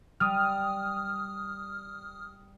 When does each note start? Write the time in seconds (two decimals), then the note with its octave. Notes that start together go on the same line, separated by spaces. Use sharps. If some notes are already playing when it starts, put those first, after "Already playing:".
0.20 G3 D#6 F6